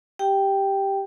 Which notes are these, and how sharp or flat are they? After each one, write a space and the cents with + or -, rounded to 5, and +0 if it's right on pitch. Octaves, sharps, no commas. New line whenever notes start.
G4 +0 G5 +0